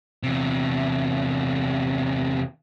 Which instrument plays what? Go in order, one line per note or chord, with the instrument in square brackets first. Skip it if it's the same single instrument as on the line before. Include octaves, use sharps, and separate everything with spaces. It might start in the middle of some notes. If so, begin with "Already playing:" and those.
[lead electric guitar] E2 C3